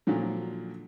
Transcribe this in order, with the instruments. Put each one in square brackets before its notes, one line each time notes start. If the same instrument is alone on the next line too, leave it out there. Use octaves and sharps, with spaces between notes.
[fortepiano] A#2 D3 F3 F#3